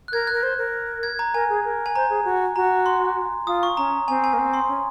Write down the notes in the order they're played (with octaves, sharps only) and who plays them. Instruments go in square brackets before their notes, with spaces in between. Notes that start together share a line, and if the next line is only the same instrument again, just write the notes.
[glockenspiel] F#6
[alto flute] A#4 [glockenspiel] G#6
[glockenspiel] F#6
[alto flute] A#4
C5
A#4
[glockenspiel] G#6
A#5
[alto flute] A#4 [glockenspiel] G#5
[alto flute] G#4
A#4
[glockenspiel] G#5
[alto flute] C5 [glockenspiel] A#5
[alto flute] G#4
F#4
[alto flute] F#4 [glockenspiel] A#5
[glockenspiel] C6
[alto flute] F4 [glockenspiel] D#6
[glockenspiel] C#6
[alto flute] C#4 [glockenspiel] A#5
[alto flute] C4 [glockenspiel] G#5
[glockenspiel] G#5
[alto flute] A#3
C4
[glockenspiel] C6
[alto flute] C#4